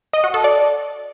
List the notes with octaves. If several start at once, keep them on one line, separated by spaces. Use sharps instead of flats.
D#5
F#4
A4
D5